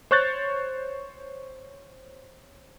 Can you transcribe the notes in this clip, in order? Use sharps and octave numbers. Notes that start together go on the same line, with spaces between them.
C5 C#5 C#6 F#6 G6 A6